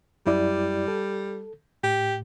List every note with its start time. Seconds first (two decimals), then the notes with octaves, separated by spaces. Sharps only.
0.27 F#2 G3 E4 D5
0.88 A4
1.83 A2 G4